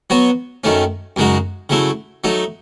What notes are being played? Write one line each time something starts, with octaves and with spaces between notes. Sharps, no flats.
F#3 B3 F#4 C#5
F#2 D#3 A3 C#4
F#2 C#3 G#3 D#4 F#4
C#3 F#3 A3 E4
F#3 A3 D#4